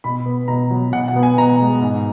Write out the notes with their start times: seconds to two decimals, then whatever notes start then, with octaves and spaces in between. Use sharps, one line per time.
0.04 B2 B5
0.26 B3
0.48 B2 A#5
0.71 F#3
0.93 B2 F#5
1.08 F#5
1.16 B3
1.23 G#5
1.38 B2 A#5
1.60 G#3
1.82 G#2